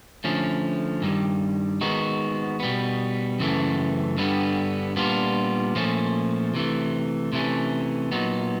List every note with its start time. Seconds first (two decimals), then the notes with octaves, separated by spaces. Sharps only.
0.24 D3 F3 A3 C#4
1.02 G2 D#3 G3
1.81 D#3 G#3 B3 D#4 F#4
2.60 B2 G3 B3
3.39 F#2 C#3 E3 A3
4.17 G2 D3 G3 B3
4.96 A#2 G3 B3 D4 F4
5.76 A#2 F3 A3 C#4
6.54 C3 E3 A3
7.32 C3 E3 A3 C#4
8.12 A#2 F#3 B3 D#4